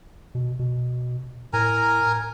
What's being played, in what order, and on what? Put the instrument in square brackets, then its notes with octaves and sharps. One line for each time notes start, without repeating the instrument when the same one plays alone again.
[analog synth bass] B2
B2
[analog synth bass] A2 [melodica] A#4 G#5 A#5